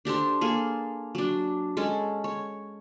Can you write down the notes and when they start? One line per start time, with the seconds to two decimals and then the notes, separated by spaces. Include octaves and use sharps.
0.05 D4 G4 A4 C5
0.41 A#3 G#4 A4
1.15 F#3 D4
1.77 G#3 C#4 A4
2.24 C#5